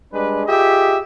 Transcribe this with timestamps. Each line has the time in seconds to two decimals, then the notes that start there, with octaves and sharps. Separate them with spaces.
0.12 G3 G#3 D4 B4
0.47 F4 G4 G#4 D#5 E5